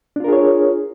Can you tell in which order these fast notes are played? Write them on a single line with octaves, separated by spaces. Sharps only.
D4 F4 A#4 G#4 C#5